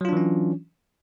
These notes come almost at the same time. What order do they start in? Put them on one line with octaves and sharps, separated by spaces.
F#3 F4 D4 E3 C#4